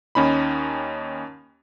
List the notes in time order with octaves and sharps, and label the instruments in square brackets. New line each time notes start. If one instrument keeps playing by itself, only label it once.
[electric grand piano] D#2 C#4 D#4 B5